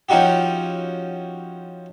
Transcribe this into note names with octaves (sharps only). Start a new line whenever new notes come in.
F3 C#4 D#4 F#4 G4